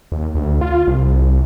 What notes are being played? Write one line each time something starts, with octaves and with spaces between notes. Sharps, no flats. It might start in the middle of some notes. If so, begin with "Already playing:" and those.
D#2
D2
F4
C2